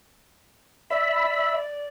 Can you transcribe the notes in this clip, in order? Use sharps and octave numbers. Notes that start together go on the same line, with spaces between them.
D5 E5 B5